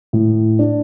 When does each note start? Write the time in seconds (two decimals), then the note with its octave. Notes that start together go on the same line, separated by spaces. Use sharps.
0.13 A2
0.59 D4